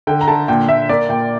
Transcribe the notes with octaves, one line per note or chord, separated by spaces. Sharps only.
D3 G5
A#5
D3 A5
A#2 G5
A#2 E5
A#3 D5
A#2 G5